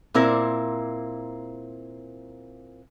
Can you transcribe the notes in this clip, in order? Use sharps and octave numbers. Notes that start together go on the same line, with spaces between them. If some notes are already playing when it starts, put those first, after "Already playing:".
A#2 C4 E4 A#4